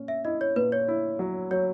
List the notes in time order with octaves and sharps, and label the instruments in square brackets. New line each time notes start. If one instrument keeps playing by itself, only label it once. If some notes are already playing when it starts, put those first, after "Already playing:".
Already playing: [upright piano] A#2 C#4
[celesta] E5
[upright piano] E4 [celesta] D#5
[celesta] C#5
[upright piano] A#2 [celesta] B4
[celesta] C#5
[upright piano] E4
F#3
[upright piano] F#3 [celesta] C#5